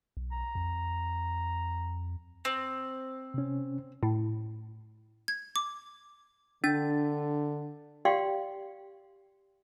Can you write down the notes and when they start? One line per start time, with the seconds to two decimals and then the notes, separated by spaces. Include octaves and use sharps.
0.17 B1
0.32 A#5
0.55 F2
2.45 C4
3.34 C3 C#4
4.03 A2
5.28 G#6
5.56 D6
6.64 D3 D4 A6
8.05 G4 D5 F5 G5 C6